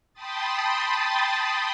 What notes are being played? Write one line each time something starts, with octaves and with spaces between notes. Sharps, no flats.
G5 A5 B5 C6 D#6 A6